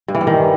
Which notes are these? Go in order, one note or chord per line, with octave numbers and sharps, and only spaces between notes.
G2
E3
G3
D#3